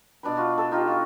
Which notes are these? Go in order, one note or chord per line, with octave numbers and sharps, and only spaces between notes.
B2 D4 B4 B5
F4 F#4
A4
D#4 F4 G4
F#4